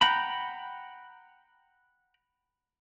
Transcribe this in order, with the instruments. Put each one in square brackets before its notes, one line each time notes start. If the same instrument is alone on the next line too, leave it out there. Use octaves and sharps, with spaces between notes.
[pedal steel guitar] F#5 G5 A#5 B5